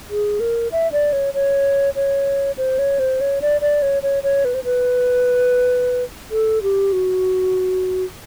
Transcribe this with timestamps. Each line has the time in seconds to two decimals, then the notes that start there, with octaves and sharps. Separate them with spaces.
0.10 G#4
0.40 A#4
0.72 E5
0.92 D5
1.13 C#5
1.34 C#5
1.96 C#5
2.58 C5
2.79 C#5
2.99 C5
3.21 C#5
3.42 D5
3.61 D5
3.82 C#5
4.03 C#5
4.23 C#5
4.45 B4
4.54 C5
4.64 B4
6.31 A4
6.63 G4
6.93 F#4